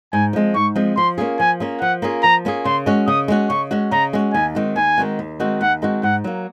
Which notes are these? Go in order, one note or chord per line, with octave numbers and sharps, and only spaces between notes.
G#2 G#5
F3 G#3 C4
G#2 C#6
F3 G#3 C4
F3 C6
A#3 C#4 F4 G#4
F3 G#5
A#3 C#4 F4 G#4
F3 F#5
A#3 C#4 F4 G#4
F3 A#5
A#3 C#4 F4 G#4
C#3 C6
G#3 C#4 F#4
C#3 D#6
G#3 C#4 F#4
C#3 C#6
G#3 C#4 F#4
C#3 A#5
G#3 C#4 F#4
D#2 G#5
D#3 G#3 C4 F#4
D#2 G#5
D#3 G#3 C4 F#4
D#2
D#3 G#3 C4 F#4
D#2 F#5
D#3 G#3 C4 F#4
G#2 F#5
F#3 A#3